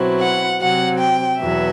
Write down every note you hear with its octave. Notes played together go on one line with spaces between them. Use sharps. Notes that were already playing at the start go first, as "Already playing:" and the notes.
Already playing: B2 F#3 C4 E4
F#5
C3 F#3 C4 F#5
G5
E2 B2 F#3 E5